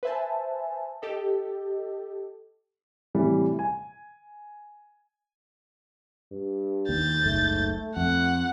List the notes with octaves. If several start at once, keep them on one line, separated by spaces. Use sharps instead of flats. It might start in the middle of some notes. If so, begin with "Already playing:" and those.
B4 C5 E5 G#5 A5
G4 A4 D#5
A2 C3 E3 G3
G#5
G2
D#2 G6 A6
F#1 C#2 G#2 A3
F2 F#5